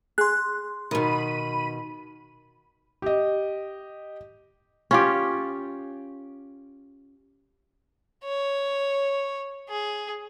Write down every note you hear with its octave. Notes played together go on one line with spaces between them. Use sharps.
G#4 C6 F#6
B2 D#3 B5 D#7
G4 D#5
C#4 F4 G4
C#5
G#4